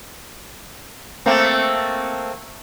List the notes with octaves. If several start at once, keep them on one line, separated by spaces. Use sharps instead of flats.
A3 A#3 C4